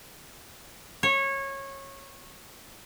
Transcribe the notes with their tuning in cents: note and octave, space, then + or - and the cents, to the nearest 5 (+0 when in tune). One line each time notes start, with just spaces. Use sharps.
C#5 -20